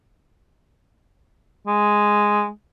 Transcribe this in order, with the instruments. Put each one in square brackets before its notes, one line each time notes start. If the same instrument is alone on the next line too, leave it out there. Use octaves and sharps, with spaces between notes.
[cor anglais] G#3